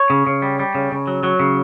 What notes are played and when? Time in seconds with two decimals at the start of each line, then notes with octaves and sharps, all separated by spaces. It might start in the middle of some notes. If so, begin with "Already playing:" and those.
Already playing: C#5
0.10 C#3
0.27 C#3
0.42 G3
0.59 G3
0.75 C#3
0.92 C#3
1.07 F#3
1.23 F#3
1.40 C#3